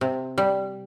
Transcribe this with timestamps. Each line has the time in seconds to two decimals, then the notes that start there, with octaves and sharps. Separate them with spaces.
0.01 C3
0.38 G3